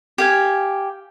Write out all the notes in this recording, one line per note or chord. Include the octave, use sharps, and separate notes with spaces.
G4 F5 G#5